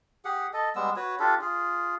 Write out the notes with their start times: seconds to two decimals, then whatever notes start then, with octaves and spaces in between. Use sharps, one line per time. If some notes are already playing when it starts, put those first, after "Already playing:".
0.25 G4 G#4 F#5
0.53 A4 D#5
0.76 G3 G#3 B3 E6
0.96 F#4 B4 C#5
1.20 D4 F4 G4 A4
1.41 F4 G#4